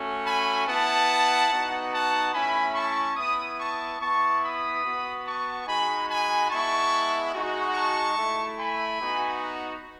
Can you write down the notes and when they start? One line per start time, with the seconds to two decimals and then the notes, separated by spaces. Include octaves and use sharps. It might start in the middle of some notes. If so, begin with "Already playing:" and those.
Already playing: A3 C#4 F#4
0.26 G#5 B5
0.67 B3 E4 F#5 A5
1.50 B3 D#4 F#4
1.92 F#5 A5
2.34 A3 C#4 E4 G#5 B5
2.75 A5 C#6
3.17 B3 E4 B5 D#6
3.59 A5 C#6
4.00 B3 E4 A5 C#6
4.42 B5 D#6
4.84 B3 F#4
5.25 A5 C#6
5.66 G#3 D#4 F#4 G#5 B5
6.08 G#5 B5
6.50 G#3 B3 E4 A5 C#6
7.33 G#3 D#4 F#4
7.75 A5 C#6
8.16 A3 E4
8.58 G#5 B5
9.00 B3 D#4 F#4